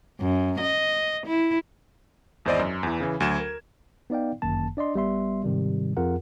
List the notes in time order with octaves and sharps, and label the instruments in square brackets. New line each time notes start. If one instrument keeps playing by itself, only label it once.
[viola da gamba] F#2
D#5
E4
[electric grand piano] G#1 E2 E4 C5 D5 D#5
F#2
E2 E3
C#3 E3
D2 F#3 G#6 E7
A#4
[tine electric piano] B3 D#4 D5 F5 G5
G1 F#2 D#3 A#3 A5
D4 D5 D#5 C6
G#1 G3 B3 E5 C6
G#2 C3 D#3 G3
F2 F4 G#4 A#4 F#5